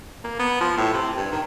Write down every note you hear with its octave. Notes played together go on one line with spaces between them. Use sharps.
A#3
B3
F3
A2
C3
G2
D#3